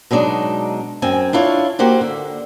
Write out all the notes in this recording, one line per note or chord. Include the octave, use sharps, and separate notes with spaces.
B2 F#3 G#3 D4 D#4
F#2 C4 G#5
D4 E4 F4 C#5
A#3 F#4 G4 C5 F#5
D3